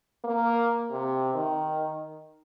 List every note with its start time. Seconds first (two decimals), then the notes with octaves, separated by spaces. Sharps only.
0.25 A#3
0.91 C3
1.35 D#3